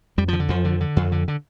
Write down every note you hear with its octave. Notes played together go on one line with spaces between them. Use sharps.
F2 G3
D3 F3
D3
F2 F3
D3
D3
F2
D3
D3